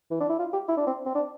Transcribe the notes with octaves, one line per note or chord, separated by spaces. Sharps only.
E3
D4
E4
F4
G4
E4
D4
C4
C4
D4